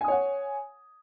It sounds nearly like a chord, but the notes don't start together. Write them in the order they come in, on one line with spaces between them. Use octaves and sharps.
G#5 D#6 C#5 F#5